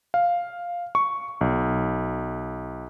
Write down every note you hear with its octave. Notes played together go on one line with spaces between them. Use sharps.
F5
C#6
B1